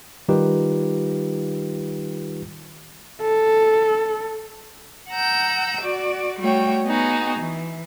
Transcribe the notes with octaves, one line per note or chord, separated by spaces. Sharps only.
D#3 G3 D#4 F4 G4 B4
A4
F#5 A#5 E6 G6
F#4 D5
G3 A3 F#4 C#5 G5
B3 D#4 F#4 G#4
E3